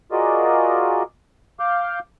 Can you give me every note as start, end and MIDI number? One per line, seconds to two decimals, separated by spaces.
0.12 1.03 65
0.12 1.03 66
0.12 1.03 68
0.12 1.03 70
0.12 1.03 74
0.12 1.03 75
1.60 1.99 77
1.60 1.99 86
1.60 1.99 89
1.60 1.99 91